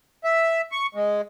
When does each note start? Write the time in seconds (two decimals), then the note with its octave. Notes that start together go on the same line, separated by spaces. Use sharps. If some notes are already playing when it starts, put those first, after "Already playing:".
0.24 E5
0.72 C#6
0.95 G#3